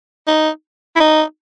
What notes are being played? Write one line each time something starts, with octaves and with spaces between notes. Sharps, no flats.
D#4
E4
D#4